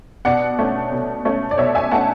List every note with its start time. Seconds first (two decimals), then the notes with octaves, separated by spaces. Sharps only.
0.25 B2 D5 F#5
0.59 A3 C#4
0.92 B2
1.25 A3 C#4
1.51 D5
1.58 B2 C#5 E5
1.75 E5 G#5
1.91 A3 C#4 F#5 A5